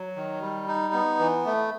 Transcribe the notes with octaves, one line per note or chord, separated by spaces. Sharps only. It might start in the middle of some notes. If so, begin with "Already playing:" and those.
Already playing: F#3
D#3
G3
D#4
B3
E3
A3